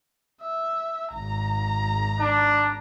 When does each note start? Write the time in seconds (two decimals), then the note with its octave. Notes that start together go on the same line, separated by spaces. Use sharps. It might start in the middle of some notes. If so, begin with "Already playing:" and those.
0.42 E5
1.14 G#1 A#5
2.19 D4